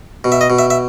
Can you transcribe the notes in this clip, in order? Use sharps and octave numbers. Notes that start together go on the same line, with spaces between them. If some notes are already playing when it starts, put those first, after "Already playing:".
B2
E5
D#5
B2
E5
E5